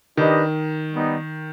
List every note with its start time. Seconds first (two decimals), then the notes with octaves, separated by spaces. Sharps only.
0.17 D#3 D4 G4 B4 D#5
0.91 G3 B3 D#4